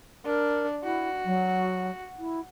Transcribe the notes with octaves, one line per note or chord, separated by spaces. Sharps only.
D4 A#4
E4 F#4
F#3
E4